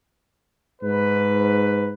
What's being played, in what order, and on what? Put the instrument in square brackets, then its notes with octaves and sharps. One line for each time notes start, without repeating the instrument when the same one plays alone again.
[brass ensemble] G#2 B4